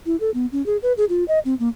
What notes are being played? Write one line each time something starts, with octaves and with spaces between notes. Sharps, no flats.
E4
A4
B3
C#4
G#4
B4
G#4
F4
D#5
C4
A#3